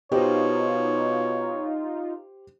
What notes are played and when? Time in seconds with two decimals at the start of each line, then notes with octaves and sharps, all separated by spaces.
0.12 B2 D#4 F4 G4 C5 C#5